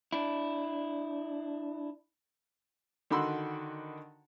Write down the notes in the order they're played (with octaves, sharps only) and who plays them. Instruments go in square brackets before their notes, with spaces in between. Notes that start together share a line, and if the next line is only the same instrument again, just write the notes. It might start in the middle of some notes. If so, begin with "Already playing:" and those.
[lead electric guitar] D4 E4
[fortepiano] D3 D#3 F#4 B5 C6 E6